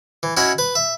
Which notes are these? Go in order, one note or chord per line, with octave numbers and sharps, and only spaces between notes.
E3
C#4 E4 F#4 D#5 F#5
B4
E5